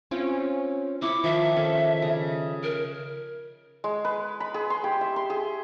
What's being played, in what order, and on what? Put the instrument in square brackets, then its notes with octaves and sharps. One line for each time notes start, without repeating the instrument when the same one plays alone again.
[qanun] C4 F4 G5 [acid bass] C#4
[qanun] E4 B5 C#6 [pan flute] D6
[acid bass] D#3 [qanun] F3 [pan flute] E5
[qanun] C#4 A4
C#3
[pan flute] A#4
[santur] G#3
B4
B5
G#4
C6
G4
E5
C6
G#4